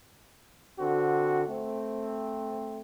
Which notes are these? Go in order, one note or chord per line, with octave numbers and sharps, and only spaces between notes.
D3 C4 F#4
A3 C4